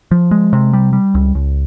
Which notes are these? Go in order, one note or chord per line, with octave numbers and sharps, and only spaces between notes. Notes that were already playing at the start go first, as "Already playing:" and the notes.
F3
G#3
C3
G3
G3
C#2
C#2